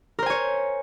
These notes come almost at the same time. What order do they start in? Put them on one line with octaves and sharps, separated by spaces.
A#4 C5 G#5 C#5